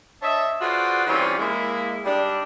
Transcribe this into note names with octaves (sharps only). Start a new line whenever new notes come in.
D4 C#5 D#5 E5
F4 F#4 G#4 B4 C5 D5
E3 G3 C4 C#4 F4
G#3 A#3 E4
G3 D4 D#4